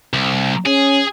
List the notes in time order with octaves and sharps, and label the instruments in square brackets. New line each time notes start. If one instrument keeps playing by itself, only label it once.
[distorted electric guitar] C2
[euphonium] C#4 [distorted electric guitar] G#4